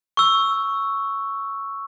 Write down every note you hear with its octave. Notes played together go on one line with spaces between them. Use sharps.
C#6 E6